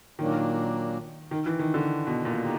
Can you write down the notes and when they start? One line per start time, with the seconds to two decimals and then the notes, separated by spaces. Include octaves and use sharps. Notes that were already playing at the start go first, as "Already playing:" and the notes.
0.19 A#2 D#3 F#3 A#3 D4
1.31 D#3
1.46 E3
1.59 D#3
1.74 D3
2.07 B2
2.25 A#2
2.43 D3 D#4 G4